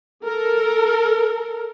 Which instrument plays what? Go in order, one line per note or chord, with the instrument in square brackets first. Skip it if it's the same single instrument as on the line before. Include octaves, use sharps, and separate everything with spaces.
[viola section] A4 A#4